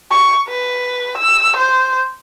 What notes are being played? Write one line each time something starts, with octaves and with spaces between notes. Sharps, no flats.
C#6
B4
E6
C5